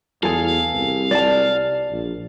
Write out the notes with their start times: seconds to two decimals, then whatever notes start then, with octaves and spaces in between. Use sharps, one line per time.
0.23 E2 G#4 A4 F5
0.71 C2
1.11 D5 A5
1.91 A#1